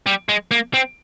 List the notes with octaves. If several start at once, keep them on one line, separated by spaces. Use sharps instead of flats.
G3
G#3
A#3
C4